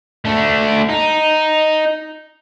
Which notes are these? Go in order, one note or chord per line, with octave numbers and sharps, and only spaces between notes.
A3 D4
D#4